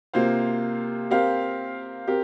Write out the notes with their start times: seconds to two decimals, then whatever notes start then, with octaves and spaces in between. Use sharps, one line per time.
0.14 C3 A#3 F4 C5 F5
1.11 C4 G4 A#4 F5
2.07 C4 G4 A#4